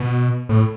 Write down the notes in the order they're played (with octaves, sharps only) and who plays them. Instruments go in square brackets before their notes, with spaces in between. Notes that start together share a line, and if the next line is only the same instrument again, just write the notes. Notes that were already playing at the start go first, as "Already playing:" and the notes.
Already playing: [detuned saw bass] B2
A2